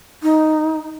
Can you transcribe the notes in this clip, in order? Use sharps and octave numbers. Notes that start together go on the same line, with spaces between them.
D#4